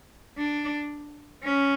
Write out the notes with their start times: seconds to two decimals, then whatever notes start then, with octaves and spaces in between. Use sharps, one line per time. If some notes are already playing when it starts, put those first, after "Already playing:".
0.38 D4
1.44 C#4